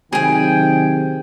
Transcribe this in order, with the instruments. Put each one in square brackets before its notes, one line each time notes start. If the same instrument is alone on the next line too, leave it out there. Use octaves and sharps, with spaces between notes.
[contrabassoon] C3 [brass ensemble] D#3 F#3 [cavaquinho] G#4 G#5 [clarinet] G5